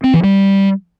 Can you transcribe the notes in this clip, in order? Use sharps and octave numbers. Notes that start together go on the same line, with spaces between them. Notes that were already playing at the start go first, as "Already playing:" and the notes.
C4
E3
G3